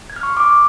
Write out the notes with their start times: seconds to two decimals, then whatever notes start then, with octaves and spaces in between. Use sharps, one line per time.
0.10 G#6
0.16 F6
0.23 C#6
0.30 C6
0.37 D6